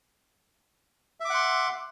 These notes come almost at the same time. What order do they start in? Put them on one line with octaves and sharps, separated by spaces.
E5 D6 F#5 C6